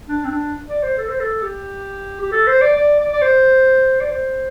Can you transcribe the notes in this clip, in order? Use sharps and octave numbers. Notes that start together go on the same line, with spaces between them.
D4
C4
D4
D5
C5
A4
C5
A4
G4
G4
A4
C5
D5
D5
D5
D5
C5
D5
C5